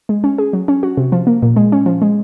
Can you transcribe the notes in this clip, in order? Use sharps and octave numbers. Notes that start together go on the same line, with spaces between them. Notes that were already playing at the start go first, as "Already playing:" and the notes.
G#3
C#4
G#4
F#3
C#4
F#4
C3
F3
A#3
A#2
G#3
C#4
F3
G#3